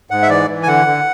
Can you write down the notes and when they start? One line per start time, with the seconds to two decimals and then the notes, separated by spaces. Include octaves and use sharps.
0.11 G#2 F#5
0.22 E5
0.29 E3 D5
0.48 E3
0.63 G#5
0.67 D3 F#5
0.87 D3